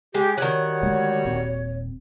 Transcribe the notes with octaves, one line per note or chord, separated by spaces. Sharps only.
G#3 G4
D#3 G3 F#4 C#5 F#5
D3 G#3 A3
D#1 A#2 C4